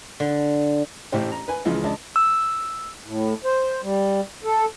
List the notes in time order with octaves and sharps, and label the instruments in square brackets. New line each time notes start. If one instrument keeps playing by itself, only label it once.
[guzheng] D3
[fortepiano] A1 A2 A3 G4 C5
A#5
B4 G#5
C#2 E3 F3 G#3
C#2 D4 A5
[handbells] E6
[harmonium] A2
C5
G3
A4